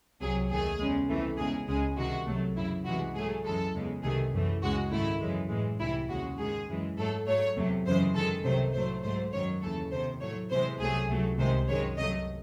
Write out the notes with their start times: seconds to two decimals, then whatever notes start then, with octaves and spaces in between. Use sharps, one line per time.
0.21 C2 C3 F#3 G#4
0.50 D#2 D#3 A3 G#4
0.80 E2 C#3 G#3
1.09 C2 C3 E3 A3
1.38 E2 C#3 G#3 G#4
1.68 C#2 C#3 G#3 G#4
1.97 C2 C3 D#3 G#3 F#4
2.27 C2 C3 F#3 A3
2.56 F#2 C#3 E3 E4
2.85 C2 C3 E3 G#3 F#4
3.15 G#2 F#3 A3 G#4
3.44 F#2 E3 G#3 A4
3.74 E2 C#3 G#3
4.03 C2 C3 D#3 A3 G#4
4.33 F#2 E3 A3
4.62 C#2 C#3 G#3 F#4
4.91 G#2 D#3 A3 E4
5.21 F#2 C#3 E3 G#3
5.50 A2 E3 G#3
5.79 C2 C3 E3 E4
6.09 D#2 C#3 G#3 F#4
6.38 G#2 D#3 G#3 G#4
6.68 F#2 E3 G#3
6.97 G#2 F#3 A3 A4
7.27 G#2 F#3 A3 C#5
7.56 E2 C3 F#3 A3
7.85 F#2 C#3 E3 G#3 C5
8.15 F#2 D#3 G#3 A4
8.44 C2 C3 D#3 F#3 A3 C5
8.74 A2 F#3 A3 C5
9.03 G#2 F#3 A3 C5
9.33 F#2 D#3 F#3 C#5
9.62 D#2 C#3 E3 A3 A4
9.91 E2 C3 D#3 C5
10.21 A2 F#3 A3 C#5
10.50 E2 C3 E3 G#3 C5
10.79 C2 C3 F#3 A3 G#4
11.09 C#2 C3 F#3 A3
11.39 C2 C3 D#3 G#3 C5
11.68 F#2 D#3 G#3 C#5
11.97 C2 C3 F#3 A3 D#5